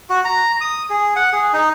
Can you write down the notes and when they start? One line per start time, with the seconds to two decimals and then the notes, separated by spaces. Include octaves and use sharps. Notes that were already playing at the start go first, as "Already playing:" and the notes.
0.10 F#4
0.25 A#5
0.61 D#6
0.90 G#4
1.16 F#5
1.32 G#4
1.53 D#4